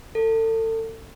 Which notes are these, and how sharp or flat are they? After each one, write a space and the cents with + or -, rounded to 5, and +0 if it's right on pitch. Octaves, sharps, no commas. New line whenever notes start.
A4 +35